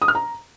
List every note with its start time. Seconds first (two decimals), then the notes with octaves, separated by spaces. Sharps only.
0.02 D#6
0.08 F6
0.15 A#5